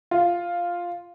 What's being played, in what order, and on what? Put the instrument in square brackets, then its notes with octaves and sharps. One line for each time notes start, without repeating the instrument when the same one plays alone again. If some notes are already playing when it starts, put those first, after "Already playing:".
[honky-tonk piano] F4